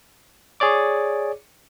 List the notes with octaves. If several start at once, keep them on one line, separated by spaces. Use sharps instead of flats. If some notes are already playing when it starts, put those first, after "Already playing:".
G#4 C#5 D5 D6